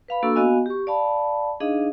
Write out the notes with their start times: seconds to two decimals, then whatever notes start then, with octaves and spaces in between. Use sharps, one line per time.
0.08 B4 F5 B5
0.23 A#3 D4 F#4 A4 C#6 E6
0.35 B3 F#4 D#5 F5 G#5
0.66 G4 C#6
0.87 D5 F5 A5 B5
1.60 D4 D#4 G#4 D#5 F5